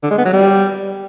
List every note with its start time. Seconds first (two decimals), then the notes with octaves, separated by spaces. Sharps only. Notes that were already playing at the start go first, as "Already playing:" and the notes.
0.03 D3
0.10 G#3
0.18 B3
0.25 F#3
0.33 G3